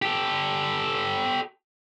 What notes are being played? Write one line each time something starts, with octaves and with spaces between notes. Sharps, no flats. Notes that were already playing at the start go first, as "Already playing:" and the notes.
G4 A4